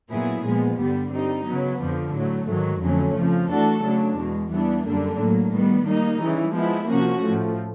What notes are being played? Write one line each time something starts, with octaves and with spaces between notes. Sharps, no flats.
A#2 F#3 B3 E4 G#4
A#2 F3 G#3 B3
G2 D3 G3 B3
G3 C4 D#4
C#3 F#3 B3
F2 D3 F3
A2 F#3 A3
G#2 D#3 F#3
F2 D3 F#3 A3 C#4
F2 C#3 F3
E3 A3 D4 F#4 A4
C#3 F#3 A3 D4
E2 B2 G#3
E3 G3 B3 D4
F#2 D3 G3 A#3 D4
A2 F#3 A#3
D#3 G3 B3
G3 A#3 D#4
C#3 E3 G3
F3 G#3 B3 E4
C3 F3 A#3 C#4 F#4
A2 F3 A3